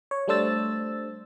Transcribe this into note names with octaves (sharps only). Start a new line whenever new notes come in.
C#5
G3 A3 D4 C5 E6 A6